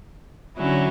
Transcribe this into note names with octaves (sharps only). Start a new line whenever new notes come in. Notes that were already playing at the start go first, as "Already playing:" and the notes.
D3 F#3 C#4 E4